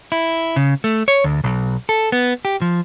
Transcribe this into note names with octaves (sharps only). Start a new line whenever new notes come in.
E4
C#3
A3
C#5
D2
B1
A4
B3
G4
F3